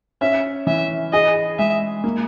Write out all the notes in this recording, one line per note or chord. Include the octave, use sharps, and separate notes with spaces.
C#4 E5
E3 E5
G#4 D#5
G#3 E5
A#3